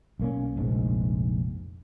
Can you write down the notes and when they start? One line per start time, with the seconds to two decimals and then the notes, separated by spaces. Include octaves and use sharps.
0.20 B1 A#3 C#4
0.56 F1 A#1 G#2